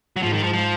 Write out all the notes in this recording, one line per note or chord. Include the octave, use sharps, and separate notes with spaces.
F#3
G#2 F3
D#3
F3
F3